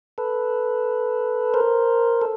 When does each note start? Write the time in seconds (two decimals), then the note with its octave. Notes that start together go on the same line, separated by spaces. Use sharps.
0.18 A4 B4
1.54 A#4 C5
2.22 A4